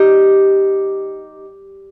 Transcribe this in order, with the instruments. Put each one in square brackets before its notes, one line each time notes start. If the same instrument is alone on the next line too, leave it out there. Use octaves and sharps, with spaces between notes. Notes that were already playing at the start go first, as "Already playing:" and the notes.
Already playing: [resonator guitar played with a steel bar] G3 D#4 G4